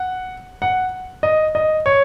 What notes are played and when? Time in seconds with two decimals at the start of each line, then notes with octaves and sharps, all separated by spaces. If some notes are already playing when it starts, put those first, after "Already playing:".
Already playing: F#5
0.62 F#5
1.23 D#5
1.55 D#5
1.86 C#5